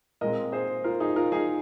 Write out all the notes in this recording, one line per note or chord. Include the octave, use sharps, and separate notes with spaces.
A#2 G#3 C4 A#4 D#5
G#4 C5
F4 A#4
D#4 G#4
F4 A#4
D#4 G#4